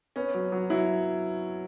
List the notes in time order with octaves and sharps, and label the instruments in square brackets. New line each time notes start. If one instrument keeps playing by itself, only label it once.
[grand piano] B3 [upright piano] C#4
[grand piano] F#3
F#3
[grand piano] F#3 [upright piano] E4